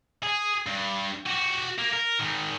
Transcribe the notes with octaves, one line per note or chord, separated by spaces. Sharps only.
G#4
G2
F#4 G4
A#3
A#4
G#2 D#3